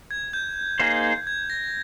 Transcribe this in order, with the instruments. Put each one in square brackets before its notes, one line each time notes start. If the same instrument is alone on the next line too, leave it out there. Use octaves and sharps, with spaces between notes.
[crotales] G#6
G6
[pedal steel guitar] A#3 D#4 G#4 C5
[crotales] G#6
A#6